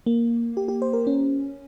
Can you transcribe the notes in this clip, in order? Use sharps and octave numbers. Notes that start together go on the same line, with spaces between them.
A#3
G4
G4
C5
A#4
C#4